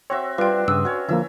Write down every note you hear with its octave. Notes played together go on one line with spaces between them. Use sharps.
C4 F#4 C#5 E5
G3 D4 F4 B4 C5 G5
G2 C#3 D4 E5 D#6 E6
C#4 F#4 C#5
D3 F3 A#3 E4 E6